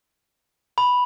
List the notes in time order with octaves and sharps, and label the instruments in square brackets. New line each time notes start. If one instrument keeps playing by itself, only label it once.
[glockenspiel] B5